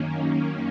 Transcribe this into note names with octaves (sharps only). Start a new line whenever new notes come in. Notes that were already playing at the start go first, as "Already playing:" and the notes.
Already playing: F#2 D#3 A#3 C#4